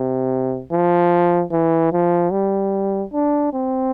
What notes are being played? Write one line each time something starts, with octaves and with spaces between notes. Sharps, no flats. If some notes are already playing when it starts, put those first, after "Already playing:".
Already playing: C3
F3
E3
F3
G3
D4
C4